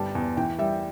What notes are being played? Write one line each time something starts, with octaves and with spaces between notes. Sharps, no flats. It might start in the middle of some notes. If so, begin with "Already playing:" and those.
Already playing: G1 G3 A5
E2
E3 G5
G3 E5